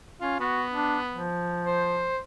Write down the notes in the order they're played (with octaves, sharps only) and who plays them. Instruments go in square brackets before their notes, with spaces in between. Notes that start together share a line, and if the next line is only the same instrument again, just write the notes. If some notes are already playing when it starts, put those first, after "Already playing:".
[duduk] C#4 [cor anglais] F4
[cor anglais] B3 [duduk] F#4
[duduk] D4
F3
[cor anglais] C5